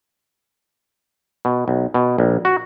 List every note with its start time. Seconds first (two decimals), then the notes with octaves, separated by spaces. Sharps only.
1.45 B2
1.68 B1
1.94 B2
2.18 A#1
2.45 F#4